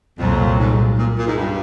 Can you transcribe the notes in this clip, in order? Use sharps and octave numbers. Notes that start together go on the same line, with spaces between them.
C2 F2 A#2 F#3
G#2
A#2
A#2
G#2
G2